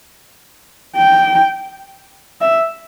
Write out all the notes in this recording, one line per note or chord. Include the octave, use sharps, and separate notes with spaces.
G5
E5